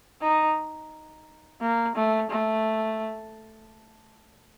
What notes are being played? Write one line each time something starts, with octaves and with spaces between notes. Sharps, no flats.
D#4
A#3
A3
A3